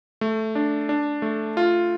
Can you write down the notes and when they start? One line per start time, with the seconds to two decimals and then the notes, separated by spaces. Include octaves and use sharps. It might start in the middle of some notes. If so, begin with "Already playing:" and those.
0.21 A3
0.55 D4
0.89 D4
1.22 A3
1.57 F4